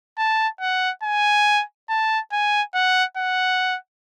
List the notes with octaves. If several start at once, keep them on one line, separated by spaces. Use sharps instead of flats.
A5
F#5
G#5
A5
G#5
F#5
F#5